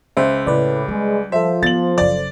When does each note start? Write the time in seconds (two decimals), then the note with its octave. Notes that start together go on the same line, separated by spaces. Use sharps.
0.17 C#2 C5 E5
0.47 A2 C#3 B4 D5
0.88 G3 G#3
1.32 F3 A4 C5 E5
1.63 B3 A6 F#7
1.98 F#1 F#2 D5